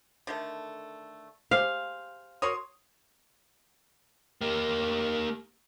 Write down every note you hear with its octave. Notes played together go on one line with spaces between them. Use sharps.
D3 D#3 A3
G4 G#4 C5 F5
F#4 A#4 C#5 C6 D#6
A#3 G4